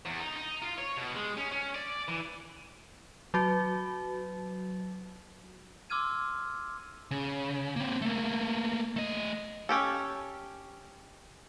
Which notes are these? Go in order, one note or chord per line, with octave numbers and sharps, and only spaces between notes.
E2
D#4
D#4
F4
C#5
B2
G#3
C#4
C#4
D5
E3
F#3 F#4
C6 D6 E6 F6 G#6 D#7
C#3
A#3 C4
A3 A#3
A3 D#5
C#4 G4 A4